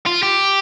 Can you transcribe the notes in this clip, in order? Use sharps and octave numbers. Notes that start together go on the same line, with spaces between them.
F4
G4